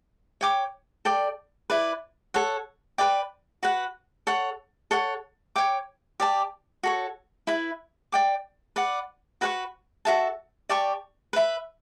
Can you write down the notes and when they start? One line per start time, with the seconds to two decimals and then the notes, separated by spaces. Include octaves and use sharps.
0.41 C#5 G5 D6
1.05 A4 D5 G5
1.70 E4 B4 D5
2.34 A4 C#5 F#5
2.98 B4 D5 G5 D6
3.63 F#4 B4 F#5
4.27 A4 C#5 F#5
4.91 A4 C#5 F#5
5.56 C#5 G5 D6
6.20 G4 D5 A5
6.83 F#4 A4 C#5
7.47 E4 B4 E5 B5
8.12 D5 G5 D6
8.76 B4 D5 F#5
9.41 F#4 B4 F#5 C#6
10.05 F#4 A4 E5 A5
10.69 G4 D5 A5 C#6
11.33 B4 E5 B5